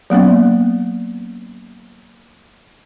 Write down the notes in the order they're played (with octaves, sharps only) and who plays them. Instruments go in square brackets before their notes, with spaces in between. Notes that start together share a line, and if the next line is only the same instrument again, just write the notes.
[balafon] F#3 A#3 B3 C#4